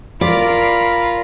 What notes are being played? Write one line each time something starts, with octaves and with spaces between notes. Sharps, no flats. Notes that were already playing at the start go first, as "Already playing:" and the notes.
F4 A#4 D5 B5